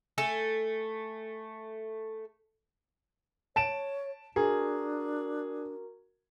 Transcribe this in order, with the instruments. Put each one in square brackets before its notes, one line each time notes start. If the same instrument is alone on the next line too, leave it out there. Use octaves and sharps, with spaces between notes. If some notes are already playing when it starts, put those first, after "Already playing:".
[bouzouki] A3 A4 G#5
[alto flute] C#5 [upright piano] A5 D7 E7
[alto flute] D4 [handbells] F#4 A#4 A#5 [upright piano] G#4